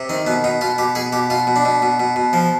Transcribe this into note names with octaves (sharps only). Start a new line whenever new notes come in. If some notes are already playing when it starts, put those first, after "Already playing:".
Already playing: C3
D#3 C4
B2 B3
B2 D#4
B2 F4
B2 G4
B2 G#4
B2 G4
B2 F4
B2
D4
B2
B2
B2
B2
F3